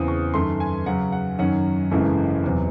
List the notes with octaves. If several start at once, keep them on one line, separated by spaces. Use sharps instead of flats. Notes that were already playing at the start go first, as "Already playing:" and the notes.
Already playing: E2 C#3 E3 C4 D#6
C#6
F#2 D#3 A3 C6
G#5
F#2 C#3 F#3 C#4 F#5
F#5
F#2 D#3 F#3 C#4 F#5
G#1 F#2 C#3 E3 A3
E2 C3 F#3